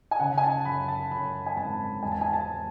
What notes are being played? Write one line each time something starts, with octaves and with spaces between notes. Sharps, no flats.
G#5
C#3 F#5
G#5
A5
F#2 B5
A5
F#2 B5
G#5
G#1 A5
E1 G#5
A5
G#5
A5